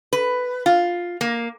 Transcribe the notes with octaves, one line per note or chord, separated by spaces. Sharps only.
B4
F4
A#3